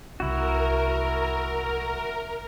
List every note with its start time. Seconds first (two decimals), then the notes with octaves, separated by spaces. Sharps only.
0.20 C2 E4 F#4 A#4